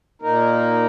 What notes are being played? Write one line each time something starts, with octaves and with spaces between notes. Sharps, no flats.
A#2 A#3 D#4 A#4